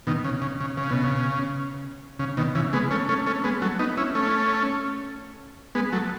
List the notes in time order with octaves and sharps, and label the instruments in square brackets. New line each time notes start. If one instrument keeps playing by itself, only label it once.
[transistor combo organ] B2 D#3
C#3
C#3
C#3
C#3
B2
C#3
C#3
B2 D#3
C#3 E3
G#3 B3
A3 C#4
A3 C#4
A3 C#4
G#3 B3
F#3 A3
B3 D#4
C#4 E4
A3 C#4
G#3 B3
F#3 A3